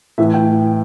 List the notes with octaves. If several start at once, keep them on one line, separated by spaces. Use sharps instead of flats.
A2 E3 E5
G5